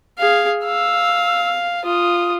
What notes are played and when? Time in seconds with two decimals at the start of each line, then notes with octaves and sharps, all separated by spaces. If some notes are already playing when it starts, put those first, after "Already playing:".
0.19 G#4 F5
0.65 F5 E6
1.85 F4 D#6